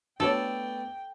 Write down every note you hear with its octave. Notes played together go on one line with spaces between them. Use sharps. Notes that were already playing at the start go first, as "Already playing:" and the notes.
A3 B3 D4 F#4 A4 C#5 D5 G5